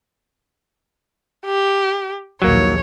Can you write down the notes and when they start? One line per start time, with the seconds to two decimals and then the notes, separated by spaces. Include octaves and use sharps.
1.45 G4
2.42 A#1 D#2 E3 F#3 A#3 C#5